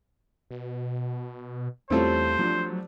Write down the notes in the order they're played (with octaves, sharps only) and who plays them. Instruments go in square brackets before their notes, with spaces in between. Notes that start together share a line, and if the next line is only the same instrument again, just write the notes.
[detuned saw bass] B2
[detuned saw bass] E2 [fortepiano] G3 A3 C4 [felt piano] C#4 E4 F4 [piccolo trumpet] C5
[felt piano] F3 D4 [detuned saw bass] F#3